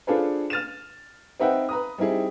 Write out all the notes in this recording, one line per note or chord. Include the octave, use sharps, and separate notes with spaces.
D4 F4 G#4 A4 B4 C5
F6 A6 D#7 E7
C4 D#4 B4 E5 F#5 G5
B4 A#5 D#6
G3 C4 D#4 E4 G#4